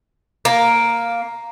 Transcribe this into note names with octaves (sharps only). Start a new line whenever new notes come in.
A#3